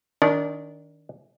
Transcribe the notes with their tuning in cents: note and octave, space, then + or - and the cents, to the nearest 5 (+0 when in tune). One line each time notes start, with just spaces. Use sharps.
D#3 +0 D4 -25